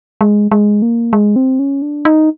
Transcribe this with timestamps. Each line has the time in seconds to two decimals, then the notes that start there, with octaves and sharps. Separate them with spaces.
0.21 G#3
0.51 G#3
0.82 A#3
1.13 G#3
1.36 C4
1.59 C#4
1.82 D4
2.05 D#4